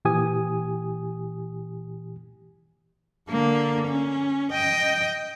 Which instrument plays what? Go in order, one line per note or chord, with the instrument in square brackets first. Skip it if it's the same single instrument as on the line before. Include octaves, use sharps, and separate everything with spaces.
[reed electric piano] A#2 E3 G4 G#5 D#6
[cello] D3 A#3
C#4
D#5 G5